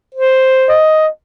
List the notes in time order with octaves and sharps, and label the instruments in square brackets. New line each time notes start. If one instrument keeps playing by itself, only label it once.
[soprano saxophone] C5
[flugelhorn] D#5